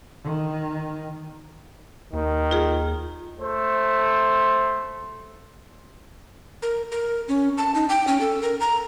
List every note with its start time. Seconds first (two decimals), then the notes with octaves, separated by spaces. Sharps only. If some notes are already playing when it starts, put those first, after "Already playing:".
0.24 D#3
2.13 D#2 D#3
2.51 F4 G#4
3.40 A3 C5
6.62 A#4
6.92 A#4
7.28 C#4
7.58 A5
7.75 D#4
7.89 G5
8.07 C#4
8.20 A4
8.42 A#4
8.60 A#5